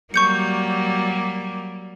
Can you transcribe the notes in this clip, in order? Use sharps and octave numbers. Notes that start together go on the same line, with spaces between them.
F#3 G3 A#3 C#6 G6 C#7